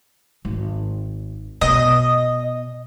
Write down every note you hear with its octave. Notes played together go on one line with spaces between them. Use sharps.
G#1
B2 D#5